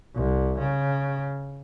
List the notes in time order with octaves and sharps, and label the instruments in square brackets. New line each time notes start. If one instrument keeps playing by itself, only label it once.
[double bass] C2
C#3